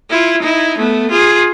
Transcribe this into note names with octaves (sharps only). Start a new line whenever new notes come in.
E4 F4
D#4 E4
A3 B3
F4 G#4